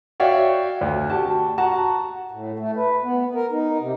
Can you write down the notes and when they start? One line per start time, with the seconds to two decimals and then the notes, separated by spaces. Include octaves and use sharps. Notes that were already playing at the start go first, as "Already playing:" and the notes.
0.20 F#4 C#5 D5 E5 F5 G5
0.81 D2
1.10 F#4 G4 A5
1.58 F#4 F#5 A5 A#5
2.31 A2
2.59 A3
2.77 B4
3.04 B3
3.35 A#4
3.52 D#4
3.80 C3